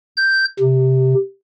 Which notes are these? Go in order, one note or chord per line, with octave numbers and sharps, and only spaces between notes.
G6
C3